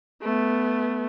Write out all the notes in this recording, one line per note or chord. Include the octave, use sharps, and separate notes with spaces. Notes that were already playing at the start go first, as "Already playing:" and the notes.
A3 B3